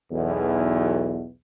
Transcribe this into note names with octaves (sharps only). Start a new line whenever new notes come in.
B1 E2